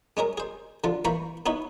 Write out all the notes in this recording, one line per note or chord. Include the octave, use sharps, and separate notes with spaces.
G#3 C#4 G#4 A#4
G#4 C5
D3 F3 F4
E3 A#3 C5 A#5 B5 C#6
B3 D#4 E4 B4 C#5